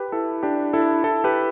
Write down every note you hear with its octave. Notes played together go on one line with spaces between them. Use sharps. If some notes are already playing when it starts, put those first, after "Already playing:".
Already playing: G4 B4
E4 A4
D4 G4
E4 A4
E4 A4
G4 B4